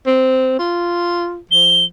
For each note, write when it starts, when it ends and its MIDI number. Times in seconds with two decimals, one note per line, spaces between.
0.07 0.58 60
0.59 1.38 65
1.51 1.87 53
1.51 1.85 103